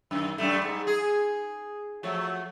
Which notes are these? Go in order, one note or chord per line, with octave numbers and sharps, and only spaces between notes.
F#2 D#3
F#2 G3 A3
G#2
G#4
F3 F#3 A3